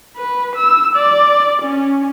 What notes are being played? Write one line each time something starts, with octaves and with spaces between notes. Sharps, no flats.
B4
E6
D5
C#4